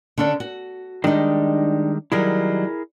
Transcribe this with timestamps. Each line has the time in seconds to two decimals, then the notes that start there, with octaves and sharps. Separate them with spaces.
0.18 D3 C#4 D4
0.40 F#4
1.04 D#3 G3 G#3 D4 D#4
2.12 D#3 F#3 G3 E4 G#4 A#4